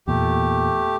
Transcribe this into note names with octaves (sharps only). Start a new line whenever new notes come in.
E2 A#2 A3 G4